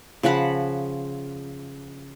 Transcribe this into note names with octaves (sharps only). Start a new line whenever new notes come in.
C#3 F3 F#5 B5